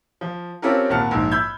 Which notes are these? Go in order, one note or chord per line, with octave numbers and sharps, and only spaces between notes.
F3
C4 C#4 F4 G4 A4 A#4
G#1 A#2 F#5 A5 F6
A#1 G#2
B5 E6 G6 G#6